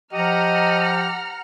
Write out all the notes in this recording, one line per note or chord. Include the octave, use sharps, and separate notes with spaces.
F3 G4 D#5 F#5 A#5 F6